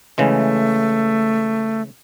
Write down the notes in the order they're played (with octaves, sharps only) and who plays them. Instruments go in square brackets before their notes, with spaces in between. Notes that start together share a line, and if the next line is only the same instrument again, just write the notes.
[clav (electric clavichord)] C#3 E3 G#3 [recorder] A3